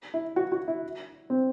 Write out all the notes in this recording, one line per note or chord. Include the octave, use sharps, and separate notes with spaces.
E4
F#4
F#4
E4
C4